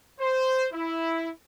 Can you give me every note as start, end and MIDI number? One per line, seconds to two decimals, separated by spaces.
0.20 0.67 72
0.72 1.30 64